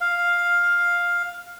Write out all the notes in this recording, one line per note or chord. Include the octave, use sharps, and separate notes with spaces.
F5